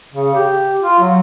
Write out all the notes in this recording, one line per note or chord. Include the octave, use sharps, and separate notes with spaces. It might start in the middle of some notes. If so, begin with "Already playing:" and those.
C#3
G4
F4
F#3